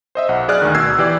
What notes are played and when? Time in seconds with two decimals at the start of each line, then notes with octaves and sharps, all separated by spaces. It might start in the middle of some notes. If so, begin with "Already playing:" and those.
0.15 C5 D#5 E5
0.29 B1 F#5
0.49 G#4 D5 F6 F#6
0.62 D2 D#3
0.75 B2 E6 G#6 C7
0.98 E3 G4 D5